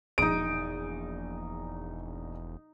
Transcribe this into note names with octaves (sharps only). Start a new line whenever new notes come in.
E1 A#1 D#4 D#6 D7